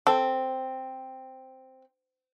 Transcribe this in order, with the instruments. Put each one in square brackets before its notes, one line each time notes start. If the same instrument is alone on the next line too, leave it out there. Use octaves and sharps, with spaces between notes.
[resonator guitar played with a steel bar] C4 [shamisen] A4